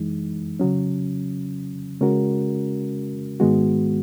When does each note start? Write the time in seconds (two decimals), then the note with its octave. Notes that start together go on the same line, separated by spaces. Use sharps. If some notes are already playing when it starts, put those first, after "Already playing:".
Already playing: F#2 E3 G#3 D#4
0.60 C#3 F#3 C#4
2.01 C#3 G#3 C#4 F#4 A#4
3.40 G#2 D#3 G#3 B3 F#4